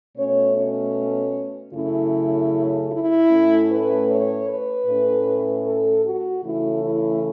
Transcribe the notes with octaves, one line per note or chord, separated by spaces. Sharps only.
B2 A3 C#4 C#5
C#4
F#2 C#3 A3 C#4 E4
E4
A2 A3 C#4
B4
C#5
B4
A2 A3 C#4
A4
F#4
C#3 E3 A3 C#4 E4
E4